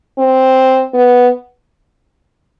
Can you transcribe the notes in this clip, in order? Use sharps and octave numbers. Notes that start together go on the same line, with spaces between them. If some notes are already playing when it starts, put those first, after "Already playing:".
C4
B3